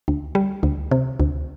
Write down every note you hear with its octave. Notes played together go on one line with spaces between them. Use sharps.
D2
G3
D2
C3
D2